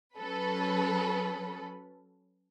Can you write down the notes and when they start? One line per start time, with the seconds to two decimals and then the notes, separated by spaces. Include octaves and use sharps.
0.16 F#3 C#4 A4 B4 B5